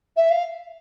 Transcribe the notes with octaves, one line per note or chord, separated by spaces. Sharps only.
E5
F5